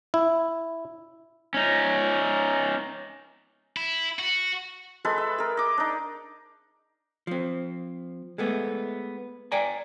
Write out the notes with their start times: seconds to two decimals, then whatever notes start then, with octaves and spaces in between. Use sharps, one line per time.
0.14 E4
1.54 C#4 D#4
3.77 E4
4.19 F#4
5.05 G#3 A4 B4 G#5
5.18 E5
5.38 G#4 A#4
5.57 D#5 D6
5.78 D4 D#4
7.27 F3 C4
8.38 G#3 A3 B3
9.52 D5 G5 G#5 A#5